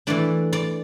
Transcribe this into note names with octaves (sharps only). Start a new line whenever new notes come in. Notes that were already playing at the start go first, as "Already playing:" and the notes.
E3 A3 D4 D5
D5